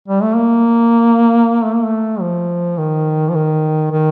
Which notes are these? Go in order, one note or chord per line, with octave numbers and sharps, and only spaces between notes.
G3
A3
A#3
A3
A#3
A3
F3
D#3
F3
D#3
D#3